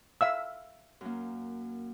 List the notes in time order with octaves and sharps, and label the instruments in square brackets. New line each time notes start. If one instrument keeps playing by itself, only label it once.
[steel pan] E5 F5 E6
[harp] F#2 A#3